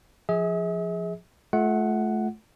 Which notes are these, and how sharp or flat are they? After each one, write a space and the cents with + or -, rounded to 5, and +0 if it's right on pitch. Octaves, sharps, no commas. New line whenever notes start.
F3 +0 G#4 +0 E5 -45
A3 -30 F4 +0 F#5 +0